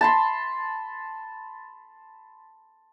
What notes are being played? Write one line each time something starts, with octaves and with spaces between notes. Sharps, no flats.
A5 B5 C6